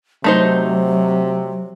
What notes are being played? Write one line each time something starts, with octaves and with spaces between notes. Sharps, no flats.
C3 F#3 A3 D#4 C5